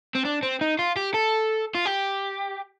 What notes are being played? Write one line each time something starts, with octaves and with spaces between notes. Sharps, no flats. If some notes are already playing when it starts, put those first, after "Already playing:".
C4
D4
C4
D#4
F4
G4
A4
F4
G4